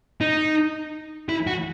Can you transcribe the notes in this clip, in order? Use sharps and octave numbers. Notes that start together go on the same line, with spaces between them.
D#4
E4
F#4